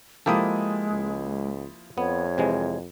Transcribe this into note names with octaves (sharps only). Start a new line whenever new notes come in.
F3 G#3 A#3 E4 G4 A4 D#6
C#2
F2 B3 C#5
C3 E3 G#3